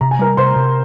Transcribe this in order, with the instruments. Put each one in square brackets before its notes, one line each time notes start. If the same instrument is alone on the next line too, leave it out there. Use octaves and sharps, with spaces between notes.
[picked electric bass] C3 [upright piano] A#5
[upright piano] G#5
[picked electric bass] G3 [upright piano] A#4 A#5
[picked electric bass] C3 [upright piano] C5 C6
[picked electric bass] C3